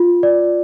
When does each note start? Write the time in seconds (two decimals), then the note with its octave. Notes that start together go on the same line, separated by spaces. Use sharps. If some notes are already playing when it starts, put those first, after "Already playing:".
Already playing: F4
0.23 D5